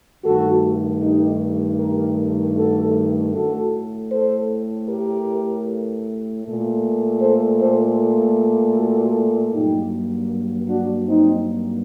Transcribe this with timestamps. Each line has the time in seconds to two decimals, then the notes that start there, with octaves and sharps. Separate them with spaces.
0.25 G2 D#3 A3 F#4 A4
1.02 D#4 G4
1.79 G4 A#4
2.56 F#4 A4
3.34 A2 A3 F#4 A4
4.12 A4 C5
4.89 G4 A#4
6.44 A#2 A3
7.21 A4 C5
7.60 A4 C5
8.76 F#4 A4
9.53 G2 F#3 A#3 D#4 G4
10.70 D4 F#4
11.08 C4 D#4